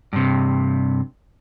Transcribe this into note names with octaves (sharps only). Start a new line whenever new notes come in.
G2 C3